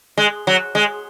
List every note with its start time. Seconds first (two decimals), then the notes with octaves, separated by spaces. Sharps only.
0.17 G#3
0.47 F#3
0.75 G#3